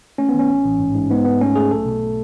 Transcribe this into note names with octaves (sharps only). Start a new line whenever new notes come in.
A3 C#4
B3
D#3
C#4
A1
A1
G#2
G#2
G#2 B3
G#2 B3
A3 C#4
A3 G#4
B1 A4
B2